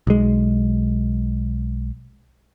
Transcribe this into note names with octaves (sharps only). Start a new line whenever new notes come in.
B1 G#3